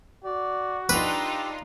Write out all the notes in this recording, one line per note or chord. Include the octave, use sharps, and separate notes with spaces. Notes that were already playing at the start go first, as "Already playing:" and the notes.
F#4 D5
D4 D#4 F4 G4 B4 D6 E6